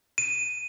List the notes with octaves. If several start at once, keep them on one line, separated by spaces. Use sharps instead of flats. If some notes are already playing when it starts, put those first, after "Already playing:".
D#7